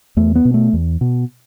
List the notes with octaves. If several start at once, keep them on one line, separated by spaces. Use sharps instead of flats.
E2 A3
B3
B2
A3
E2
B2